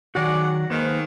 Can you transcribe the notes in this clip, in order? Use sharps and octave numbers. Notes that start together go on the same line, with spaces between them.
D#3 F#3 F#4 G#4 D5 F#5
G#2 D#3 A#3 B4 C5